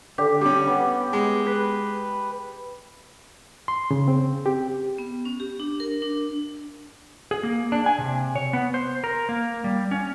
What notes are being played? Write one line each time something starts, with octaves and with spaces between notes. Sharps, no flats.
D3 G4
G3 C#4 G4
B3
G#3
B4
C6
C#3
C4
G4
B3
C#4
G4
D4
A#4
D4
G#4
A#3
D4
G#5
C3
C#5
B3
C5
A#4
A#3
G3
C#4